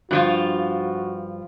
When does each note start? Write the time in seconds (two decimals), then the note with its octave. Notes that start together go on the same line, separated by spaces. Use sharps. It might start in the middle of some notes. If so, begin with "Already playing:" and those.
0.11 G2 F3 F4 F#4